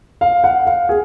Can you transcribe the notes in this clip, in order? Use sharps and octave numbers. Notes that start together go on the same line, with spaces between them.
F5
F#5
F5
G#4